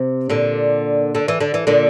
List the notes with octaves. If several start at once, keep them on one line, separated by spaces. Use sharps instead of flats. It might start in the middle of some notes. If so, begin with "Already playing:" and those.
Already playing: C3
A#2 D3
D3
E3
D3
E3
A#2 D3